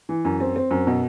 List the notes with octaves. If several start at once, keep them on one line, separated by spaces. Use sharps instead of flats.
E3
F#2
C4
C4
F#2
B2